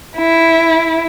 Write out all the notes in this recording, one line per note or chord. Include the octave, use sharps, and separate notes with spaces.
E4